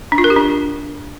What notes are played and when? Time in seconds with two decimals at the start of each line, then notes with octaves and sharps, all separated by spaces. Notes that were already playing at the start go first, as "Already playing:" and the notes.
0.12 D4
0.18 F4
0.24 A#4
0.30 G4
0.36 D4